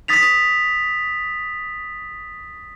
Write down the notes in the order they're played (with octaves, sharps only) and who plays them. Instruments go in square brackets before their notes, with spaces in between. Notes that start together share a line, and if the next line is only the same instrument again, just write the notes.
[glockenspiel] D#6 A6 B6 F7